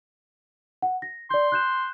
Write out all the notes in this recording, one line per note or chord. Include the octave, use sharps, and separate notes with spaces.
F#5
A#6
D5 C6 G6
F#6 G6 E7